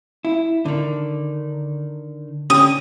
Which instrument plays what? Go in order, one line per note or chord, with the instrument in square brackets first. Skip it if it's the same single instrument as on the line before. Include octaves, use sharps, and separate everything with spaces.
[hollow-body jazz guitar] E4
D3 D#3
[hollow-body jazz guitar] D3 C#4 G4 [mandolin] D#6